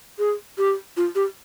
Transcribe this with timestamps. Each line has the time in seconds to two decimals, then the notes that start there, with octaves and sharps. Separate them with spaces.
0.19 G#4
0.58 G4
0.97 F4
1.15 G4